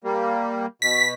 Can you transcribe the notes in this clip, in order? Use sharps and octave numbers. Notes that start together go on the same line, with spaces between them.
G3 A#3
B2 B6